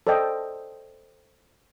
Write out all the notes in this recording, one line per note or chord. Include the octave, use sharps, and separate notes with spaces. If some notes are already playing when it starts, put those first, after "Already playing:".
A4 C5 D5 D#5 G5